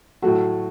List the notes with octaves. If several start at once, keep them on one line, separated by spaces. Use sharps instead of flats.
A2 F#3 A3 F#4